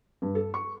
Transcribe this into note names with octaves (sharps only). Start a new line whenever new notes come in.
G2
A4
C#6